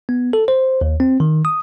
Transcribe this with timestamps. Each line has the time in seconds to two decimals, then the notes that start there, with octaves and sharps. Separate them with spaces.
0.09 B3
0.33 A4
0.48 C5
0.81 D#2
1.00 C4
1.20 D#3
1.45 D#6